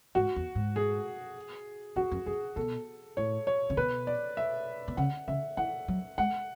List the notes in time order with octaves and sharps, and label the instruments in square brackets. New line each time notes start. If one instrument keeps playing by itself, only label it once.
[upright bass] G#2 [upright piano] F#4
[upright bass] E2
G#2
[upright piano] G#4
[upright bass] F#2 [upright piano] F#4
[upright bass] F#2
[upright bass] F#2 [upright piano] G#4
[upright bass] B2 [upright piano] A4
[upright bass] A2 [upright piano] C#5
[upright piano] C#5
[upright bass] C#3
[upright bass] B2 [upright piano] B4
[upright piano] D5
E5
[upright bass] B2
[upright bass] C#3 [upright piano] F#5
[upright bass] C#3 [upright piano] E5
[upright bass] E3 [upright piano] F#5
[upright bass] F#3
[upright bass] G#3 [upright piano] F#5